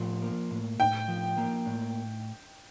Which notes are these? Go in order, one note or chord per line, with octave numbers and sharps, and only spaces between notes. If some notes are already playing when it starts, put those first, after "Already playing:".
Already playing: A2 F3
A#3
A2
A2 G5
F3
A#3
A2